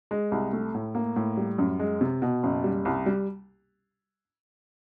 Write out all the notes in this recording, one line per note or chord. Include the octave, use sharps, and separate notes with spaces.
G#3
C2
A3
A2
A#3
A2
G3
F#2
G#3
C3
B2
F#1
G3
C2
G3